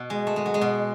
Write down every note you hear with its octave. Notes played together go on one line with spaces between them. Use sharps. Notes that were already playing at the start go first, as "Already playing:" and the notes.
Already playing: B2
G#3
A3
G#3
F#3
G#3
B2